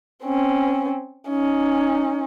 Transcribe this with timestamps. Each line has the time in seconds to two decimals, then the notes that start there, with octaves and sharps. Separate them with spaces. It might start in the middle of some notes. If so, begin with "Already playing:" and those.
0.25 C4 C#4
1.29 C#4 D#4